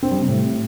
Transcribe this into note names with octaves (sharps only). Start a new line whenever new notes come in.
C4
G3
C3
A2